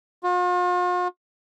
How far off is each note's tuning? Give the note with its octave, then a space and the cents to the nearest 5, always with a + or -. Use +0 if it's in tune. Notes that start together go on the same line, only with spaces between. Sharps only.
F4 +45